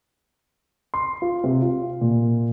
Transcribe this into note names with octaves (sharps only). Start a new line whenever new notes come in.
C6
F4
C3
F4
A#2